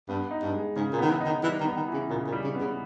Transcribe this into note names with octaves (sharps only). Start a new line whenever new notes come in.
G2 B3
D#4
G2
G#3
G#2 C#3
A#2
D#3 B3
E3
D#4
D#3
E3 G3
D#3
B3
D#3
E3
C#3
A#2 C#3
A#2
G3
C#3
B3
C#3